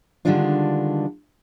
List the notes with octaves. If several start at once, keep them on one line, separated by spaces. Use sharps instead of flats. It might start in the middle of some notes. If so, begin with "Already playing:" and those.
D3 D#3 G3 G#3 D4 F4